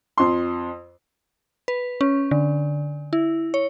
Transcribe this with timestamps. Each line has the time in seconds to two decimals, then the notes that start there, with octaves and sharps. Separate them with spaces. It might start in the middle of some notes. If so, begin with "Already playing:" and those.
0.18 F2 C6
1.68 B4
2.01 C#4
2.31 D3
3.13 E4
3.54 C#5